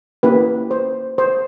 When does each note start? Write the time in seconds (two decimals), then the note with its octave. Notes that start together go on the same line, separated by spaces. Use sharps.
0.23 A#3 C#4 E4 G4 B4
0.71 C5
1.18 C5